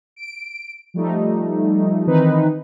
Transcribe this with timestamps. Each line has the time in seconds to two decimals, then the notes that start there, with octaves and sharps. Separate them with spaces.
0.16 D7
0.94 F3 G3 A3 D#4
2.07 D#3 E3 C4 D#4 B4